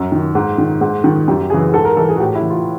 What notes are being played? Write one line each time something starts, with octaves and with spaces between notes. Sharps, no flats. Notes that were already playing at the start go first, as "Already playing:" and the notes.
Already playing: F#2
D#3
G#2
D#3
G#2
D#3
F#2 G4
C#3 E3 G#4
G#2 A4
A#4
E3 A4
G#4
F#4
A2 G4
E4
E3
F4